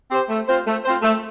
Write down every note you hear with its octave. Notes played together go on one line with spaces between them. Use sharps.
C4 G4 C5
A3
C4 F4 C5
A3
C4 F4 C5
A3